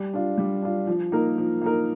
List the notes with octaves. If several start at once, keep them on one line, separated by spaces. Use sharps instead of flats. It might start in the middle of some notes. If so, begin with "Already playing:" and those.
Already playing: G3
D4 F4
G3
D4 F4
F3
A#3 D#4 A#4
F3
A#3 D#4 A#4